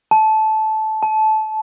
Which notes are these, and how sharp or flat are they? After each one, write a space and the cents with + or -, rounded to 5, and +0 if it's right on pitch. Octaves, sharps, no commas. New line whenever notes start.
A5 -15
A5 -20